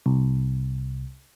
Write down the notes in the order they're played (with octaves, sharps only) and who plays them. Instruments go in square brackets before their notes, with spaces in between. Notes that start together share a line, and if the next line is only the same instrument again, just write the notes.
[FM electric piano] C2